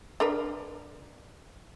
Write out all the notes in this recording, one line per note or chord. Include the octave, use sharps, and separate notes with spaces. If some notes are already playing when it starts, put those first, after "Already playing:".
D4 A#4 B4